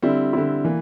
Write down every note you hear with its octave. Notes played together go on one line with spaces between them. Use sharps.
D3 G3 C4 E4
D3 G3 C4 E4
E3 A#3